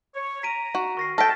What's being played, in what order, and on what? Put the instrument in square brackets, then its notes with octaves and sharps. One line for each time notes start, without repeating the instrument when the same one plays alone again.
[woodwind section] C#5
[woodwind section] A#5 [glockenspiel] B6 D7 D#7
[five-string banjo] F#4
[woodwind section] D#3 A#4 [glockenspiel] C#6 A#6 C7
[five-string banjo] A4 G5 [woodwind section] A5 [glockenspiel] F6 A#6 B6